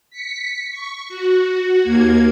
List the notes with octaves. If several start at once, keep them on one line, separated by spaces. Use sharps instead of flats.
B6 C#7
C#6
F#4
D#2 A#3 G#6